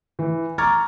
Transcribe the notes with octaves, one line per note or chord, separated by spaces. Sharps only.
E3
A#5 C#6 D6 F6 G#6 A6